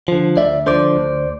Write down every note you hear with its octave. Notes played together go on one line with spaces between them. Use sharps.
D3 F3
D2 D5 E5
D3 F3 C5 D5
D2